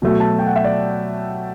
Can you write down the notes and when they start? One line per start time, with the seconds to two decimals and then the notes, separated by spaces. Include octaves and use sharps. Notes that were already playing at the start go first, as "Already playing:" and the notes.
0.02 B2 F#3 A3
0.20 A5
0.39 G5
0.47 F#5
0.56 E5
0.64 D5